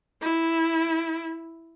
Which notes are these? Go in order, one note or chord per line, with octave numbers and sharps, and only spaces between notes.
E4